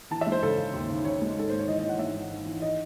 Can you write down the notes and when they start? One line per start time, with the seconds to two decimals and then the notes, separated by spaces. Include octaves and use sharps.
0.11 E3 A5
0.21 E5
0.26 G#3
0.32 C5
0.43 C#3 A4
0.58 C#3
0.73 D#2
0.90 C#3
1.05 C#3 C#5
1.21 G#3
1.37 G#1 A4
1.50 G#2 C5
1.59 C#5
1.67 E3 D#5
1.79 D#5
1.83 E3
1.89 F#5
1.99 G#2 E5
2.15 G#1
2.31 G#1
2.46 E3
2.62 D#5